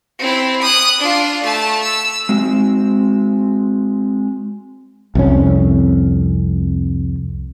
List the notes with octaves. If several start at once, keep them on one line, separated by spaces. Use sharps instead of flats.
C4 E4
D#6 F#6
D4 F4
A3 A5
E6
G#3 C4 F#4
C2 F2 C#4